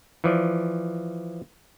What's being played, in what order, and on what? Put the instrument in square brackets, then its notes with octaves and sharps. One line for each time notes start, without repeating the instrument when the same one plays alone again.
[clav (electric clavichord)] E3 F3 D5